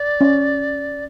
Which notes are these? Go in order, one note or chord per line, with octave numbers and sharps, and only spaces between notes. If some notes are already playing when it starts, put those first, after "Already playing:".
Already playing: D5
C#4